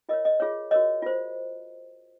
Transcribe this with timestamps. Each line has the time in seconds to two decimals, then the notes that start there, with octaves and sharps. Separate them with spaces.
0.09 F4 A#4 C#5 D#5
0.25 D#5
0.40 F4 G#4 C#5
0.71 F#4 A#4 C#5 D#5
1.02 F4 C5